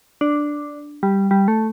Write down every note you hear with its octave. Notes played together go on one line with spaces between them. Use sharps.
D4
G3
G3
A3